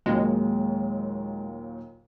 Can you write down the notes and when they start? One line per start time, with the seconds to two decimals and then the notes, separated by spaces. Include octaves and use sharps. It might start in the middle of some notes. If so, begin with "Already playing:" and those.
0.06 D#2 A#2 F#3 G#3